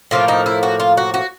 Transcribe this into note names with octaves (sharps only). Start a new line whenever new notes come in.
A2 F3 A#3 F4
D#4
E4
F#4
F4
F#4
F#4